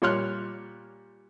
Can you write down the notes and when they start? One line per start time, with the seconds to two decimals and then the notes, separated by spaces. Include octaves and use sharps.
0.02 A#2 G3 C#5 C6 F6 F#6